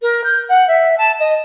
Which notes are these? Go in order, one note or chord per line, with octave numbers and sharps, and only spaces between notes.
A#4
G6
F#5
E5
A5
D#5